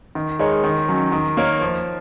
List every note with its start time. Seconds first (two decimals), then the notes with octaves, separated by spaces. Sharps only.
0.15 D#3
0.39 G#3 D#4 A#4 C#5
0.64 D#3
0.88 F#3 C#4
1.12 D#3
1.37 A#3 D#4 A#4 C#5
1.61 F3